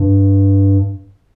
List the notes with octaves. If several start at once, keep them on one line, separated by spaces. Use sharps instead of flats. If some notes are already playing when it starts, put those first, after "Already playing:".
Already playing: G2